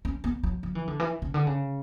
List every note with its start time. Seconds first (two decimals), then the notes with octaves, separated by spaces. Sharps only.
0.05 C#4
0.24 B3
0.43 F#3
0.63 F#3
0.75 E3
0.87 D3
1.00 E3
1.22 C#3
1.34 D3
1.47 C#3